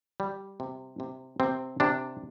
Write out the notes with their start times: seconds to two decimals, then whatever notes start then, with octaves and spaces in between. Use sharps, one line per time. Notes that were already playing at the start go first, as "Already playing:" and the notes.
0.20 G3
0.60 C3
1.00 C3
1.40 C3 C4
1.80 C3 D4